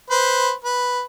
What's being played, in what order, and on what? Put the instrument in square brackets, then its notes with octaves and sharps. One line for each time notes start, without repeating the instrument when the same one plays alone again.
[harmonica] B4 C5
B4